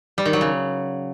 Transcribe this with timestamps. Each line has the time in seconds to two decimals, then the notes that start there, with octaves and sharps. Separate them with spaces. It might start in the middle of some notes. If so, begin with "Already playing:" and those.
0.18 G3
0.25 D#3
0.33 F#3
0.41 C#3